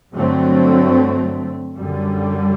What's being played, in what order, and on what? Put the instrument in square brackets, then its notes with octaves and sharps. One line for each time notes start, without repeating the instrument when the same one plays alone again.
[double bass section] G2 D3 F#3 A3 C4
F#2 D3 G3